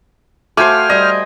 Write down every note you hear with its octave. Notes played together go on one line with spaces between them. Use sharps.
A3 F#4 C5 F5 G5 G#5 D6 F6
G3 D#5